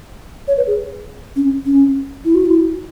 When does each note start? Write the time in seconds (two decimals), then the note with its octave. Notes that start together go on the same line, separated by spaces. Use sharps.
0.48 C#5
0.57 B4
0.67 G#4
1.36 C#4
1.66 C#4
2.25 E4
2.35 F#4
2.46 E4